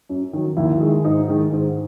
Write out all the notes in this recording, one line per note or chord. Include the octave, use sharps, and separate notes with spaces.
F#2
D#3 F#3
D#2 E4
D#3 G#3
G#2 D#4
D#3 G#3
G#2